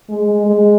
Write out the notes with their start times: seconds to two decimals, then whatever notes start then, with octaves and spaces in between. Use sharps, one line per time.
0.09 G#3
0.46 G#3